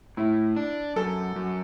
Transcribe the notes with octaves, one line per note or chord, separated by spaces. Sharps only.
A2 E4
D4
F#2 A4
F#2